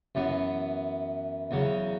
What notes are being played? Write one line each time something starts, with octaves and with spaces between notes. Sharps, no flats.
F#2 E3 B3
E2 C#3 F#3